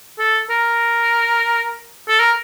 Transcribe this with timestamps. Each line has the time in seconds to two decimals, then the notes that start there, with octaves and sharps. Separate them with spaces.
0.19 A4
0.50 A#4
2.08 A4
2.20 A#4